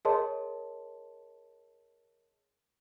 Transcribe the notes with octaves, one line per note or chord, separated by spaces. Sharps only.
G#4 A#4 C#5 D#5 A5 C6